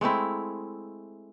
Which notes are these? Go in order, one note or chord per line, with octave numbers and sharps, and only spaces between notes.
G#3 A3 C4 E4